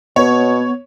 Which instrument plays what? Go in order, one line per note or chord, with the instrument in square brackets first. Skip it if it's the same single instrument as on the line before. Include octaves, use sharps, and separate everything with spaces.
[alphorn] B2 [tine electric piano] B3 [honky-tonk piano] C#5